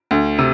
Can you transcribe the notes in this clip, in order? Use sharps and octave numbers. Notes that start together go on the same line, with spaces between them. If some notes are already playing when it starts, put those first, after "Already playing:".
D2
C3